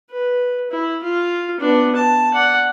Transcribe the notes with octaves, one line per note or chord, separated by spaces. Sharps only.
B4
E4
F4
B3 D4
A5
D5 F#5